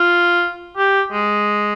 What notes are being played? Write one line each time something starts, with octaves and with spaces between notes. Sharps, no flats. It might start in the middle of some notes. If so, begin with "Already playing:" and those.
Already playing: F4
G4
G#3